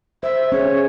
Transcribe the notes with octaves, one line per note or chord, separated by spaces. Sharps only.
C5 E5
C#4 G#4 C#5